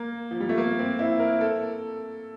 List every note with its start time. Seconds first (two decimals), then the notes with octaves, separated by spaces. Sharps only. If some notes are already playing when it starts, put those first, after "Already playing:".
Already playing: A#3
0.31 F3
0.40 G3
0.49 A3
0.58 A#3
0.79 C4
0.99 E4
1.19 A#4
1.41 A4